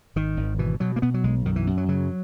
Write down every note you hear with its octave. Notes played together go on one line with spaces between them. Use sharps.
G#1 D#3
G#1
B2 E3
B2 F#3
A#3
B2 B3
F#3
B1 G#3
F#2 D#3
E3
F#2
F#3
C#3 F#3